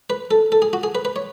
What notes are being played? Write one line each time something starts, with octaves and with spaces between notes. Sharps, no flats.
B4
A4
A4
G#4
F#4
G#4
B4
B4
C#5